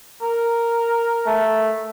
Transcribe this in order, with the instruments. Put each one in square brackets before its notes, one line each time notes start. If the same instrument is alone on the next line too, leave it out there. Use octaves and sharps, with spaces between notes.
[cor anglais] A#4
[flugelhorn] A3